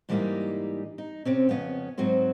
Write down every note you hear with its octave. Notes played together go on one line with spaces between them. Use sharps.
G#2 E3 G3 A#3 D#4 G4
D#4
C3 C4 C#4
F2 C#3 B3 C#4
G#2 F#3 C4 F#4 C5